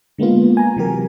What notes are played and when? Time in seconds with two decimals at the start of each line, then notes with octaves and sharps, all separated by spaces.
0.18 D3 G#3 A#3 B3 F4
0.57 G#5 A#5
0.76 C3 E3 F#3 G4 A#4